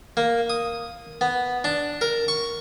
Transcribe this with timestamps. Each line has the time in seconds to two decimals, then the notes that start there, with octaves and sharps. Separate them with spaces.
0.17 A#3
0.50 D#6
1.21 B3
1.64 D4
2.01 A#4
2.28 C#6